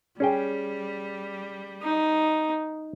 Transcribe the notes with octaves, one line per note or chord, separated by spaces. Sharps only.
G3 C#4 G#4 G5
D#4